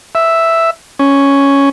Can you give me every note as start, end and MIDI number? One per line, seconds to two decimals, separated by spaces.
0.15 0.70 76
0.99 1.69 61